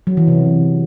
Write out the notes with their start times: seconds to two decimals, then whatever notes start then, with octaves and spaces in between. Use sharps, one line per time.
0.07 F#3
0.17 E3
0.28 C3